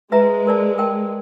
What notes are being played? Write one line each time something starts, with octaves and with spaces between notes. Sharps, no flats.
G#3 B4 E5 A#5
A#4 D5 A5
A#4 G5 A5